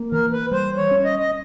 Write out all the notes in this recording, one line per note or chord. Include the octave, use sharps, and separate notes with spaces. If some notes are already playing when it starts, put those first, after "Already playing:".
Already playing: A#3
E3 A#4
B4
G3 C5
C#5
C#4
D#5
D#5